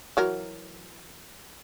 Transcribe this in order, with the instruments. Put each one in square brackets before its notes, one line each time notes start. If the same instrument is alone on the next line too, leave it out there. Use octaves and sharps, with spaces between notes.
[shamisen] E3 F#3 A#4